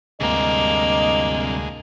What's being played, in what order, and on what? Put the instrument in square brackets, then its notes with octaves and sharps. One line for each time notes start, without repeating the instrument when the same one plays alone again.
[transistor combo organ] D2 G#3 [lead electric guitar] G2 C3 [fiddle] A#3 [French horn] D#5